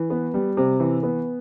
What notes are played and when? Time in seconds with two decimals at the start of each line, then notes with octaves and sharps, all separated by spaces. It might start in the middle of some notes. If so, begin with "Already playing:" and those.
Already playing: E3
0.10 B3
0.34 G3
0.57 C3
0.80 E3
1.03 B3